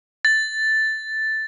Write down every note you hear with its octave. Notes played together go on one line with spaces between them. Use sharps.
A6